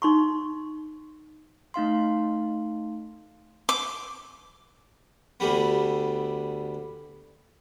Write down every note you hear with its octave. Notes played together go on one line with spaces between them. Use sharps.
D#4 C6 C#6
A3 D#4 F5 C6
D6
D2 D3 G3 B3